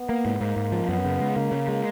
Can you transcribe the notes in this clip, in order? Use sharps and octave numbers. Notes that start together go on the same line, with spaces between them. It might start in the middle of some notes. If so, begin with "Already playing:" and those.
Already playing: B3
A#3
G#2
G#2 A#3
G#2
F3
F#2 B3
C#3
G#3
C#3 A#3
C#3
G#3